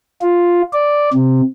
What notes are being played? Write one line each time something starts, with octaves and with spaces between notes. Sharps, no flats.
F4
D5
C3